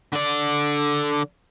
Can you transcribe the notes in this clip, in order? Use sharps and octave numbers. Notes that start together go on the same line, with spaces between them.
D3 D5